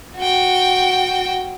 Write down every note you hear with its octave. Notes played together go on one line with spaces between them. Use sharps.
F#4 G5